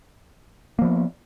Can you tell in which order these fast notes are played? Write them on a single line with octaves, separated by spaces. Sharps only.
A#3 F3 B3